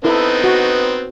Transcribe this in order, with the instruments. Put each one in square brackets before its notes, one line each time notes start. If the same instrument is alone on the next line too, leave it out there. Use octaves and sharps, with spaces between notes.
[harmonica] B3 C4 D#4 [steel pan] E4 A4
[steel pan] F#4